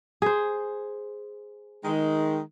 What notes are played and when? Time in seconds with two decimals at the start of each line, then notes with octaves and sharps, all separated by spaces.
0.22 G#4 C5
1.84 D#3 G#3